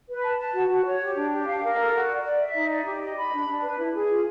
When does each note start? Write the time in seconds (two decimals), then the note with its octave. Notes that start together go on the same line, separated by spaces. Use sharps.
0.08 B4
0.23 A5
0.39 A5
0.54 F#4
0.69 F#4
0.85 C#5
1.01 G4
1.16 D4
1.31 G4
1.47 F5
1.62 A#4
1.78 A4
1.93 F#4
2.09 D5
2.23 D5
2.39 E5
2.54 D#4
2.70 D5
2.85 G4
3.00 D#5
3.17 B5
3.32 D4
3.47 D4
3.62 B4
3.78 E4
3.94 G#4
4.09 F4